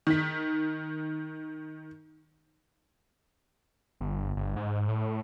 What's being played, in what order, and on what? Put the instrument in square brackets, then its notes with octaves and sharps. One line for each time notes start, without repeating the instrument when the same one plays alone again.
[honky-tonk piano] D#3 B6
[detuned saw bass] G1
G1
G#2
A2